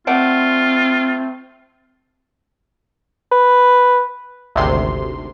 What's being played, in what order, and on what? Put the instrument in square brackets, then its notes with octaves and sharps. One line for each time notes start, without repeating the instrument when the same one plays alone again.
[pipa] A3 D5 F#5 [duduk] C4 [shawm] F4
[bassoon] B4
[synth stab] G#1 D2 C3 C6